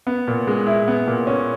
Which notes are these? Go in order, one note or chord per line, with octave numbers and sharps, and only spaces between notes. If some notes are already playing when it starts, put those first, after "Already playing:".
B3
A#2
G#3
E4
B3
A#2
C#4